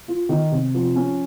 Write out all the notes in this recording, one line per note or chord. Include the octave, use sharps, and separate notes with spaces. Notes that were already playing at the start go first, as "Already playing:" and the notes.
F4
D#3
C3
F3
C#4